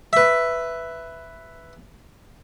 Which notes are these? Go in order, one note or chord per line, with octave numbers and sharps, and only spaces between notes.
B4 E5